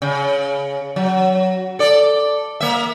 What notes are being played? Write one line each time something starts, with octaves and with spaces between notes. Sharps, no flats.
C#3
F#3
A4 D5
A#3 E5